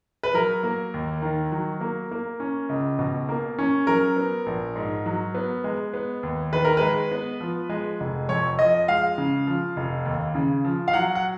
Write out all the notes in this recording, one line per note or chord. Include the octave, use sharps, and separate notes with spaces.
B4
F#3 A#4
A#3
D#2
D#3
F#3
A#3
A#3
C#4
C#2
B2
A#3
C#4
F#3 A#4
B3
A#1
G#2
F#3
B3
G#3
B3
D#2
D#3 B4
A#4
G#3 B4
B3
F3
G#3
F1
F2 C#5
F3 D#5
G#3 F5
C#3
F3
F1
D#2
C#3
F3
F5
F#3 F#5
F#5